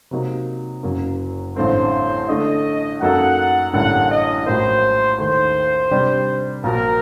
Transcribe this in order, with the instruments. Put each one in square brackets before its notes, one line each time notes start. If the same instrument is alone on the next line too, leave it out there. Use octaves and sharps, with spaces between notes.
[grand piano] C3 F#3 A#3 D#4
F#1 F#2 F#3 A#3
[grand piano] A1 G2 D3 A3 C4 [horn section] C5
[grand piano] D3 A3 D4 [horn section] D#5
[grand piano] F#2 F#3 A#3 D#4 A4 [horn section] F#5
[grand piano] A1 G2 D3 G3 A#3 [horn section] F#5
[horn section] D#5
[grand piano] A#1 A2 F#3 A#3 [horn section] C5
[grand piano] D#2 D#3 A3 [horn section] C5
[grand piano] C3 G3 D4 G4 D5
[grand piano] A#1 A#2 F#3 [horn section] A#4